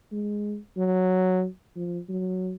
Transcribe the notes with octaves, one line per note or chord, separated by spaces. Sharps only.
G#3
F#3
F3
F#3